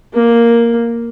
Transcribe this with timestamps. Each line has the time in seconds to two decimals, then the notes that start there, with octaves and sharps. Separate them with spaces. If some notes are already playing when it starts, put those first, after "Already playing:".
0.14 A#3